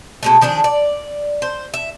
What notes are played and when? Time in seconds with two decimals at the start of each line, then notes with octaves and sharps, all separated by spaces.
0.23 B2 G#3 A3
0.41 D#3 F3 D4 G#4
0.64 D5
1.42 C5
1.74 E5